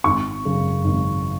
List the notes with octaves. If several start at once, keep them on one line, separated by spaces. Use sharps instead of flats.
G#1 C#6
F#2 C#3
G#1